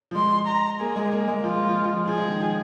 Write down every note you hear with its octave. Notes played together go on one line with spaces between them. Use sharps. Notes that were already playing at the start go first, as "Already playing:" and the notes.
F3
G#3 C6
A#5
A#3 G#4
G#3
A#3
G#3
F3 F4
G#3
F3
G#3
F3
F3 G#4
G#3
D#3
F3